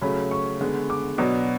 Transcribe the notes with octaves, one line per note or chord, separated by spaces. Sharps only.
C#3 F#3 A3 C#4 B5
C#6
D3 G#3 B3
D6
B2 F#3 B3 D4